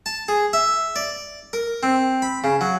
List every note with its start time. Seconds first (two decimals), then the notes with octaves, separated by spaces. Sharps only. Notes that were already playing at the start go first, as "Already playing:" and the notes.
0.06 A5
0.28 G#4
0.53 E5
0.96 D5
1.53 A#4
1.83 C4
2.22 B5
2.44 C#3
2.61 F#3